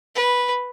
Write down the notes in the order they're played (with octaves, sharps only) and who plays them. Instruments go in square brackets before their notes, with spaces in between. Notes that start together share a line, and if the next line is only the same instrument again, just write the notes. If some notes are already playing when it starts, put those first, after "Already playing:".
[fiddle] B4